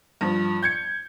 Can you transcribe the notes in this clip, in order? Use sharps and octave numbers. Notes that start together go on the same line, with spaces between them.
G2 F3
G6 G#6 C#7